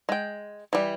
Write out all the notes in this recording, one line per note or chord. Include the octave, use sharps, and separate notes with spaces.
G#3 G5
E3 G3